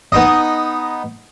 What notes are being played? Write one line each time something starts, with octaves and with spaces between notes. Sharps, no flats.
B3 D#4 D#5